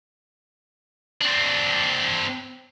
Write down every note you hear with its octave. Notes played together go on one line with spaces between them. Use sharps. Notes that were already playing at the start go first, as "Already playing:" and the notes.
C4 D4